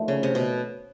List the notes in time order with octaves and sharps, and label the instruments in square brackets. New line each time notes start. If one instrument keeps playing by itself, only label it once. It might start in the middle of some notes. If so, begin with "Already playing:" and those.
Already playing: [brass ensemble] D#2 D3 F3 A3
[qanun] C#3
C3
B2